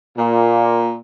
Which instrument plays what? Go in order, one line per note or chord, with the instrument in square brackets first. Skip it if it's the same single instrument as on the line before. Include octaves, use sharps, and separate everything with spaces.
[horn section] A#2